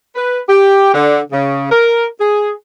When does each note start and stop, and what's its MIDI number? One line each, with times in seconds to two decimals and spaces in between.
0.15 0.40 71
0.49 0.93 67
0.94 1.20 50
1.32 1.67 49
1.71 2.06 70
2.20 2.52 68